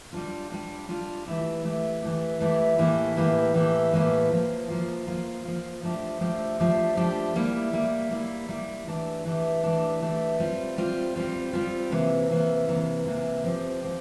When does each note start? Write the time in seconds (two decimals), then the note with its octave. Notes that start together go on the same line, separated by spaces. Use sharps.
0.13 G3 D4 F4
0.50 G3 D4 F4
0.89 G3 D4 F4
1.26 E3 A3 E4 G4
1.64 E3 A3 E4 G4
2.02 E3 A3 E4 G4
2.41 E3 A3 E4 G4
2.78 A2 E3 A#3 E4 G4
3.16 A2 E3 A#3 E4 G4
3.55 A2 E3 A#3 E4 G4
3.93 A2 E3 A#3 E4 G4
4.31 F3 A#3 F4
4.68 F3 A#3 F4
5.07 F3 A#3 F4
5.45 F3 A#3 F4
5.83 F3 A3 D4 G4
6.20 F3 A3 D4 G4
6.59 F3 A3 D4 G4
6.97 F3 A3 D4 G4
7.35 G3 A#3 E4
7.73 G3 A#3 E4
8.11 G3 A#3 E4
8.49 G3 A#3 E4
8.87 E3 A3 D4 G4
9.25 E3 A3 D4 G4
9.63 E3 A3 D4 G4
10.02 E3 A3 D4 G4
10.40 G3 C4 F4
10.78 G3 C4 F4
11.16 G3 C4 F4
11.53 G3 C4 F4
11.92 C3 E3 A#3
12.30 C3 E3 A#3
12.68 C3 E3 A#3
13.06 C3 E3 A#3
13.44 F3 C4 G4
13.82 F3 C4 G4